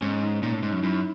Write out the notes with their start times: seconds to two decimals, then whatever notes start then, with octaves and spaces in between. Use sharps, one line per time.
0.01 G#2 C#4
0.23 D#4
0.43 A#2 D#4
0.52 A2
0.63 G#2
0.73 F#2
0.83 F#2 E4